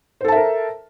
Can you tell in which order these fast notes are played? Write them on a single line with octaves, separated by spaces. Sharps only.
C5 A4 A5 E5 A#4